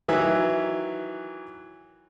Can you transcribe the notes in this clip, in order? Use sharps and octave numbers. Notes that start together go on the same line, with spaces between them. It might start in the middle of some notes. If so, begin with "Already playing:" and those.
D#3 E3 F#3 E5 F#6